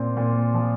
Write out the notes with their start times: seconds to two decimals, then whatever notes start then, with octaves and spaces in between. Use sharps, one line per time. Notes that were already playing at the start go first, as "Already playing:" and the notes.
Already playing: A#2 C4
0.17 A#2
0.54 F3